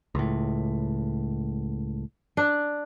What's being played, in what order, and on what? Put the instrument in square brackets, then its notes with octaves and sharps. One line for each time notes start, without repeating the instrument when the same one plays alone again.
[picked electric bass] C#2 A2
[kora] D4